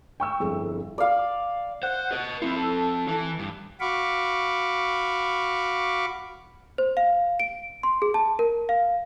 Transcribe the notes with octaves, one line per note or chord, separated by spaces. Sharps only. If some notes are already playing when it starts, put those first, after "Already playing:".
G5 C#6 E6
G1 F2 E4 G#4
D5 F5
C5 F#5
B4 D#5
C4 E4 F4
A4
E3
G2
F#4 F5 B5 C#6 D6
C5
F5
D7
C6
G#4
A5
A#4
F5